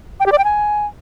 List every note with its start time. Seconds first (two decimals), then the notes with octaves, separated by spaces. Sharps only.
0.20 G5
0.26 G4
0.32 D5
0.38 G5
0.44 G#5